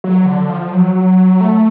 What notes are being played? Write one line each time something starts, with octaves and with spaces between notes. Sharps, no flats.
F#3
D3
F3
F#3
F#3
A3